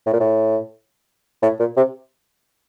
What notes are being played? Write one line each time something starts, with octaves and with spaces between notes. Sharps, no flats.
A2
A#2
A2
A2
A#2
C3